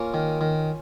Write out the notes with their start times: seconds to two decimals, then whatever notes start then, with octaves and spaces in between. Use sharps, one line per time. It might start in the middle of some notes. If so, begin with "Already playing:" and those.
Already playing: A#3 C#4 F4
0.14 D#3
0.41 D#3